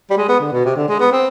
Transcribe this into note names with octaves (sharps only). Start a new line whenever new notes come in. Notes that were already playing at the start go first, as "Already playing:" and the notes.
G3
G#3
B3
D3
B2
C3
D3
G#3
B3
C4